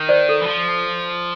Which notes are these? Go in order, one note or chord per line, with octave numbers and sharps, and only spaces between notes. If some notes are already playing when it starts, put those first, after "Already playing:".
Already playing: D#3
C5 D5
A4
E3
F3